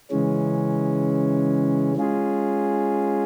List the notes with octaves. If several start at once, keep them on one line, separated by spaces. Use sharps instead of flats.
C#3 E3 G#3 C#4
G#3 C#4 F4 G#4